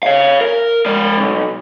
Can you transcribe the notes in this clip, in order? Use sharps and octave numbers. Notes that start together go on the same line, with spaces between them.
C#5 F5
A#4
G#3 D5
B1